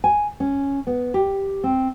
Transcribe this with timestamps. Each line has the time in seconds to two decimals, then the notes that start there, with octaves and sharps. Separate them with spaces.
0.04 G#5
0.40 C#4
0.87 B3
1.14 G4
1.64 C4